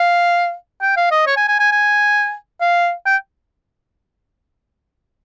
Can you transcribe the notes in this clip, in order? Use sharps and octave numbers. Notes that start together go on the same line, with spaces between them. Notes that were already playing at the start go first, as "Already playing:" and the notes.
Already playing: F5
G5
F5
D#5
C#5
G#5
G#5
G#5
G#5
F5
G5